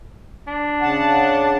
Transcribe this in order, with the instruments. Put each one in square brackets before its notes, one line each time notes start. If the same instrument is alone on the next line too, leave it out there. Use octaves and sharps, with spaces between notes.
[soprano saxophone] D4
[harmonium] C#3 F#5 A5